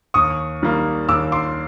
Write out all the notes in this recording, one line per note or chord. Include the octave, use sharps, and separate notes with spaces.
D#2 C#6 D#6
D#3 G3 A#3
D#2 D6 E6
C6 D6